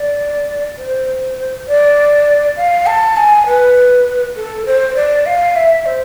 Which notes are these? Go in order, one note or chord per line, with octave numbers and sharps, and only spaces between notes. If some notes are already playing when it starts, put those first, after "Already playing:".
Already playing: D5
C5
D5
F5
A5
G#5
B4
A4
C5
D5
F5
E5
C5